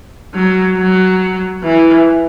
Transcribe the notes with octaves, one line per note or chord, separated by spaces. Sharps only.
F#3
F#3
E3